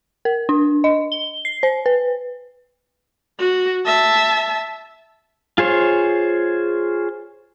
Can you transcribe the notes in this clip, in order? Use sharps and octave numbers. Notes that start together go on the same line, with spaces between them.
A#4
D4
D#5
G7
C7
C5
B4
F#4
E5 A5
F4 G#4 C5 C#5